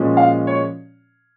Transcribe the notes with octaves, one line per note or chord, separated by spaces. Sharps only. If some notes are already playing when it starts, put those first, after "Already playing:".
Already playing: A#2 F3 G#3 C#4
F5
C#5